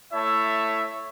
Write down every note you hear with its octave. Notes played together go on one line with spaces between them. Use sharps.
A3 E4 C#5 E5 A5